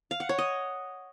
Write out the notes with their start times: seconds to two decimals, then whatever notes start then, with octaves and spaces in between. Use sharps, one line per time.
0.11 F5
0.20 F#5
0.29 C#5
0.38 D#5